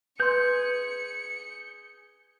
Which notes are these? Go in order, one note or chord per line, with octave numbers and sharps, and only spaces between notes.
G#4 B4 C6 G6 C#7